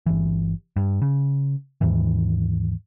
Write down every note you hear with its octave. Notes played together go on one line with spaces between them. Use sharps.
G1 E3
G2
C#3
D#2 G#2 D#3 E3